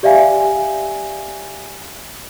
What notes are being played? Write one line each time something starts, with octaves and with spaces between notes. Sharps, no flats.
G4 D5 E5 F5 G#5